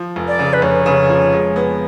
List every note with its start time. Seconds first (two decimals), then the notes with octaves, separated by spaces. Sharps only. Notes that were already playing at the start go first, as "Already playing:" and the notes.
Already playing: F3
0.16 F1
0.28 D5
0.39 C#3
0.53 B4
0.62 F1 C#5
0.86 C#3
1.09 F3
1.33 G#3
1.56 B3